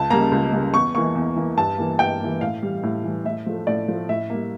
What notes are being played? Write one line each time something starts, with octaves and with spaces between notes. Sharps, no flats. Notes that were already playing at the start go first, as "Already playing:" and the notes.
Already playing: C#2 A5
C#3 G3 A#3 A#5
C#2
C#3 G3 A#3
E2 C#6
E3 A#3 C#6
E2
E3 A#3
G2 A5
E3 A#3
G2 G5
E3 A#3
A2 F5
E3 G3
A2
E3 G3
A2 E5
F3 A3
A2 D5
F3 A3
A2 E5
G3 A#3